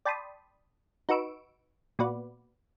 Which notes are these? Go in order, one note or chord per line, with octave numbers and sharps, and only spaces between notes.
D5 G5 A5 B5 C6 D#6
D#4 F#4 B4 C#6 E6 D7
A#2 B3 F#4 B4 D5